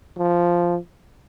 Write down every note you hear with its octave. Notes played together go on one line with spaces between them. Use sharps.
F3